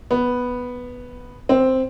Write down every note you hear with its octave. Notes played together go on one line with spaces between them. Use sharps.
B3
C4